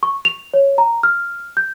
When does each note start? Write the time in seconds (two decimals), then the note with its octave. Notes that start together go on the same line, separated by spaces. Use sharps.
0.03 C#6
0.25 F7
0.54 C#5
0.78 A#5
1.03 F6
1.57 G6